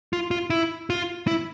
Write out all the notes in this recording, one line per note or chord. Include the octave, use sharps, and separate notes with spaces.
F4
F4
E4
F4
E4